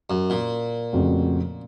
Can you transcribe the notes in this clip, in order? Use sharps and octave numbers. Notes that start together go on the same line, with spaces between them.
F#2
A#2
F2 C#3 A3 C#4 F#4